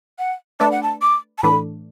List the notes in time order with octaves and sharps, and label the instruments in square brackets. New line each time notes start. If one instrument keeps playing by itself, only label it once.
[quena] F#5
[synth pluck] A3 D4 B4 D5 [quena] A5
[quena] F#5
A5
D6
A5
[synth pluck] A2 E3 A3 D4 [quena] B5